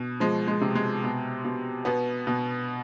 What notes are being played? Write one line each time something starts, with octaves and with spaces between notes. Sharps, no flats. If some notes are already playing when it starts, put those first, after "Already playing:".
Already playing: B2
F3 G#3
G#3
C3
G#3
B2
B2
B2 B3
B2